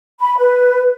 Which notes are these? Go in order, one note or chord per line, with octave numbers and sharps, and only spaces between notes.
B5
B4